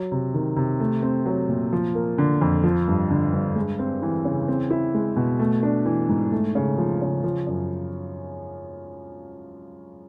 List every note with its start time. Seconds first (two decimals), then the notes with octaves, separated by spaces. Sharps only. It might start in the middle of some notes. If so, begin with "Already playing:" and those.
Already playing: F#3
0.12 C3
0.34 D#3
0.57 C3
0.80 A3
1.03 C4
1.26 F#3
1.49 A#2
1.73 F3
1.95 A#3
2.18 D3
2.41 F2
2.64 F3
2.88 G2
3.10 D3
3.33 G2
3.56 G#3
3.79 C4
4.02 E3
4.25 C#3
4.48 C4
4.70 E4
4.95 G#3
5.16 B2
5.39 A3
5.63 D4
5.86 E3
6.09 G#2
6.32 A3
6.55 C#3
6.78 F3
7.02 C#3
7.24 F3
7.47 F#2